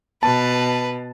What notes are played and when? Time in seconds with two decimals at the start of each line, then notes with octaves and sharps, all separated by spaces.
0.23 B2 B4 A5